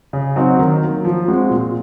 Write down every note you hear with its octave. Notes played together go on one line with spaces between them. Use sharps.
C#3
F#3 C4 D#4 F#4
D#3
F#3 A#3
F3
G#3 C4 F#4
A#2